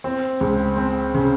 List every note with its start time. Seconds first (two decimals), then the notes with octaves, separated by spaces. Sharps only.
0.04 C4
0.41 C#2
0.77 C4
1.14 C#3